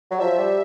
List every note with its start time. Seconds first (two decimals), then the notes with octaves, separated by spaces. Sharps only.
0.11 F#3
0.19 F3 E5
0.38 G3